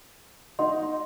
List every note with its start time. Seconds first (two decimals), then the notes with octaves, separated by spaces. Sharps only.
0.59 D#4 F#5 C6